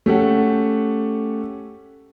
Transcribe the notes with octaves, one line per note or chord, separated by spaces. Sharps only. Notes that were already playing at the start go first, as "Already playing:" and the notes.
A3 C#4 G4 A4 F#5